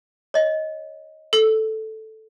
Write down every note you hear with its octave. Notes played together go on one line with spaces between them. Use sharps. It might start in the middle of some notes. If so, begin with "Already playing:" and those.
C#5 D#5
A4